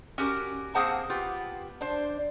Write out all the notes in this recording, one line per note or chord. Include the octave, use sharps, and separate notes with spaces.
C#4 F#4 G4 A#4
A#3 C4 G#4 C5 F#5 A5
B3 F4 G4
D4 C5